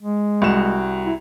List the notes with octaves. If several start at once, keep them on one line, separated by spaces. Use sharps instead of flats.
G#3
C2 F#4 E7
E4